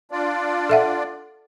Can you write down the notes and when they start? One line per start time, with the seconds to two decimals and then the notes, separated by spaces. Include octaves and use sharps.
0.11 D4 F4 D5
0.69 A4 E5 F#5